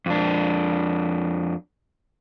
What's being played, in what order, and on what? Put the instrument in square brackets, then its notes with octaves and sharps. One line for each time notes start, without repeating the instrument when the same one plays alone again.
[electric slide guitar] F2 D4